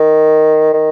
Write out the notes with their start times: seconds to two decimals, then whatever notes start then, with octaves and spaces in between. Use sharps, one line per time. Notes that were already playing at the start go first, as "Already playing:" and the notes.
Already playing: D#3
0.73 D#3